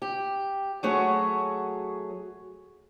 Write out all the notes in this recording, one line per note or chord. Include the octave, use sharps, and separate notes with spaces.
G4
F#3 A3 F#4 G#4 C#5